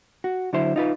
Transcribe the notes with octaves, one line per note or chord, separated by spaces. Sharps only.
F#4
D3 F#3 E4 C5
D#4 F4 B4